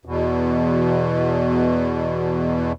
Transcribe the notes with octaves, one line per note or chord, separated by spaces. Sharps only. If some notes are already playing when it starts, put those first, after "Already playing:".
E2 B2